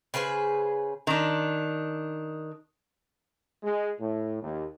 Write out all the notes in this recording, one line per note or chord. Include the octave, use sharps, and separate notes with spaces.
C#3 G#4 B4 C5
D#3 D4
G#3
A2
D#2